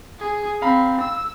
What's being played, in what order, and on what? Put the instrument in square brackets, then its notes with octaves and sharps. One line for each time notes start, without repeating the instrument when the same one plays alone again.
[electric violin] G#4
[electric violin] C4 [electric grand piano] F5 A#5 B5
[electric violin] E6